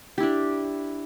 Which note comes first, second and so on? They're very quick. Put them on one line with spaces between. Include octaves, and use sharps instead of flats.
G4 E4 D4